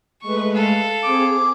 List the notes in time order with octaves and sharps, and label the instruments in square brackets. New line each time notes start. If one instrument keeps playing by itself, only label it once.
[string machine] G#3 A3 B4 [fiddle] C#6
[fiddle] A4 F5
[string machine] C4 G#4 [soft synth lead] D6